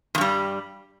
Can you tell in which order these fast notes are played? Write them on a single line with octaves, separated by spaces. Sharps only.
E2 G2 G3